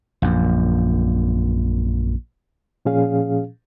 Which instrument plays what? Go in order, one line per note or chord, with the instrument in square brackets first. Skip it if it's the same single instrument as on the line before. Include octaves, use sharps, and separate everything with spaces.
[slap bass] A#1 F#2
[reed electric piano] A#2 F3 C#4 G#4 F5